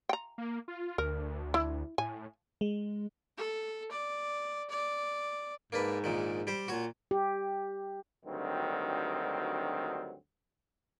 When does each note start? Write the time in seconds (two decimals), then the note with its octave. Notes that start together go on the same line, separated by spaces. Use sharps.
0.09 G5 A#5
0.38 A#3
0.68 F4
0.98 D2 A#4
1.54 E4
1.98 A2 G#5
2.61 G#3
3.37 A4
3.91 D5
4.70 D5
5.72 G#2 A#3 D4 B4
6.04 A#1 A#2 D#3
6.47 G3 G4 C5
6.68 A#2 F#4 C#5
7.11 G4
8.25 D2 G2 D#3 F#3 C4